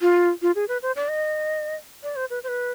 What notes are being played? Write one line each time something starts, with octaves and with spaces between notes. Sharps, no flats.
F4
F4
G#4
B4
C5
D5
D#5
D5
C5
B4
C5
B4